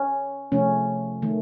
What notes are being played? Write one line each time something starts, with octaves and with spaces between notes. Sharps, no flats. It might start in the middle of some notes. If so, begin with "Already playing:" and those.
Already playing: C#4
C3 F3 A3 C#4
D#3 A3